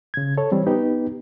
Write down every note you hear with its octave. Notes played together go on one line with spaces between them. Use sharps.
C#3 G#6
A4 C#5
E3 G3 C4
B3 D#4 G4 B4